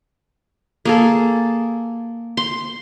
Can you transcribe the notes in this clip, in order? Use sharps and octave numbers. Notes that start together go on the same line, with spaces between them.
A#3 G#4 A4
C6